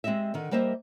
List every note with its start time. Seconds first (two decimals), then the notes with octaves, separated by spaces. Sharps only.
0.04 G#3 C4 G4 D#5 E5
0.34 D3 D#3
0.51 G3 A#3 C5 D#5 E5